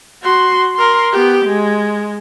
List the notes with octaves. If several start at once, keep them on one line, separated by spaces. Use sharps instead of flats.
F#4 C6
A#4 C6
B3 G4
G#3